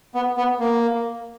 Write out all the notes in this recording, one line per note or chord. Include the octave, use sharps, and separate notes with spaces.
B3
B3
A#3